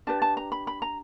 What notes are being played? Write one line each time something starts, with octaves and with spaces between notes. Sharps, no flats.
D4 G4 B4 A5
A5
A#5
B5
B5
A#5